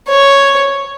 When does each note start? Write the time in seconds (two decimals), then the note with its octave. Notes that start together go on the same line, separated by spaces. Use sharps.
0.09 C#5